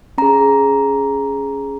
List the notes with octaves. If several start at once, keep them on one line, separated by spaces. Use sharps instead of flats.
C#4 G#4 A#5